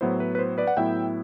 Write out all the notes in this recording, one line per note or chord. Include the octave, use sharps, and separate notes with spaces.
A2 F#3 B3 E4 C5
B4
B4
C5
B4 D5
F#5
A2 F#3 B3 E4 E5 G5